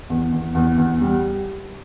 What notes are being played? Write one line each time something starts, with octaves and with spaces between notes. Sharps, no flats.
E2
E2
E2
E2
G3